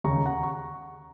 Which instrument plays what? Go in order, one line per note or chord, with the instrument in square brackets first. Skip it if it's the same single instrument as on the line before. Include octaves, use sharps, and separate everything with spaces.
[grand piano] D#2 C#3 A#5 C#6
F#5 A#5
C#6